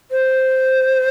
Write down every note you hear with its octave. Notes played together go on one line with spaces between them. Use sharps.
C5